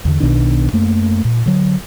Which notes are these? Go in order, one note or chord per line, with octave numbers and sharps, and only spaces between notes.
E2 D3
B1 B2 D#3 D4
F#2 A3 A#3
A#2
D3 F#3